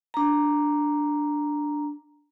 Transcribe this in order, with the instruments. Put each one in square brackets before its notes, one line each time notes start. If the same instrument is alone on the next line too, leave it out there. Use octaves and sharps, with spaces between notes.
[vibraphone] D4 A#5